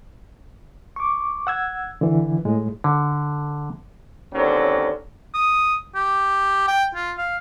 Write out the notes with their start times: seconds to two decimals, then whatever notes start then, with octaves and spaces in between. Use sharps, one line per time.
0.96 C#6 D6
1.47 F#5 E6 G#6
2.01 D3 E3
2.45 A2 G#3
2.84 D3
4.33 D#2 D3 F#3 C4 C#4
5.34 D#6
5.95 G4
6.68 G5
6.95 F4
7.18 F5